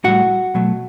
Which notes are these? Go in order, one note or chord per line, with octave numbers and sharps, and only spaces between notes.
A2 G3 F#4 F#5
B2 F#3 A3